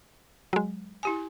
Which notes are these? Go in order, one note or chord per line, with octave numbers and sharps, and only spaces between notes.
F#3 G#3
E4 G4 G#5